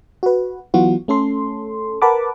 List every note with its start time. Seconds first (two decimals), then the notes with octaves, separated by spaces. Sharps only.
0.23 F#4 B4
0.74 E3 F#3 B3 F4 F#4
1.08 A3 C#4 A4 C6
2.02 A#4 B4 F#5 A5 B5 D6